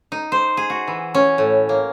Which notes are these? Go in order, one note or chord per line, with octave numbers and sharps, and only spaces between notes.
D#4
C5
G#4
F#4
E3
C#4
A2
A#3